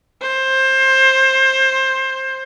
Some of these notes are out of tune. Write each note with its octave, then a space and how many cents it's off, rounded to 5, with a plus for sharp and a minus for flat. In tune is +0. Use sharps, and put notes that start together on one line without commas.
C5 +20